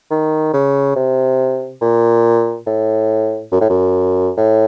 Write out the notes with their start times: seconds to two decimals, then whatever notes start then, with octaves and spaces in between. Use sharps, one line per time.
0.11 D#3
0.54 C#3
0.96 C3
1.81 A#2
2.67 A2
3.52 F#2
3.61 A2
3.70 F#2
4.37 A2